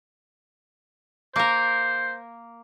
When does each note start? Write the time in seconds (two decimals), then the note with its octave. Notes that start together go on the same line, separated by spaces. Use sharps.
1.36 A#3 A#4 C5